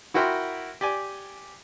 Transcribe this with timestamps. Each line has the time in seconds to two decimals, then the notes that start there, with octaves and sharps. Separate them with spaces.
0.14 E4 F#4 A#4 E5 G5 C6
0.81 G4 D5 G#5